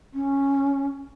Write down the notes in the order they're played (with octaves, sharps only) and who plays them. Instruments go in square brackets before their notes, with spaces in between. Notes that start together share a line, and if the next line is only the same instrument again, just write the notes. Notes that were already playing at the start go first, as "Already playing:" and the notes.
[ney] C#4